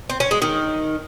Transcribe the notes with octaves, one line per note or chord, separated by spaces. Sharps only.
C4
C#4
G#3
D#3